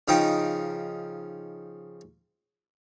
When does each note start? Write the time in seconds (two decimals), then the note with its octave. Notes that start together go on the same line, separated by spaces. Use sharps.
0.08 C#3 F3 D#4 G5